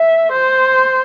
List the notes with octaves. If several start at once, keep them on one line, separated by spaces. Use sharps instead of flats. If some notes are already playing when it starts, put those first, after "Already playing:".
Already playing: E5
C5